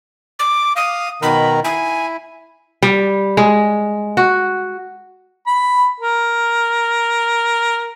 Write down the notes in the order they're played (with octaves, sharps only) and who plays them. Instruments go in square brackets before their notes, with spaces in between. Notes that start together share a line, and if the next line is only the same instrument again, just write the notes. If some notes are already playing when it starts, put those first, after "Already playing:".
[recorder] D6
[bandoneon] F5 [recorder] D#6
[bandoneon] B2 D#3 A#4 [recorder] B5
[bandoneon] E4 [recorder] G#5
[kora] G3
G#3
F#4
[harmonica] B5
A#4